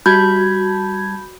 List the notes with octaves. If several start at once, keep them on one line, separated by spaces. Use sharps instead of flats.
G3 F#4 A5 B5 G6 G#6